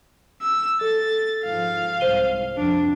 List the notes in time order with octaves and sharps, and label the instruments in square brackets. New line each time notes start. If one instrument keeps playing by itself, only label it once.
[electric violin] E6
[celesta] A4 [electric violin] A6
[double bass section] G#2 F3 [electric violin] F5
[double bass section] C2 G#2 [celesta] C5 D#7 G7
[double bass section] F2 [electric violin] D4